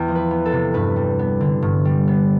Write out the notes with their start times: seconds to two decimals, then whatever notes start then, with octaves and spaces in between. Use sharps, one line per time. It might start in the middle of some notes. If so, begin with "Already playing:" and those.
Already playing: E2 B3 G5
0.08 F3
0.15 B4
0.31 B3
0.46 A4
0.52 C3
0.74 G2 B4
0.96 G3
1.19 B3
1.40 D3
1.62 G2
1.85 G3
2.07 B3